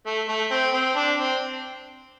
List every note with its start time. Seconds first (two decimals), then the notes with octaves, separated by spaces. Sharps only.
0.06 A3
0.28 A3
0.51 C4
0.74 C4
0.96 D4
1.19 C4